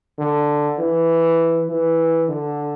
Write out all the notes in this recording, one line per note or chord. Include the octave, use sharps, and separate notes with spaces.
D3
E3
E3
D3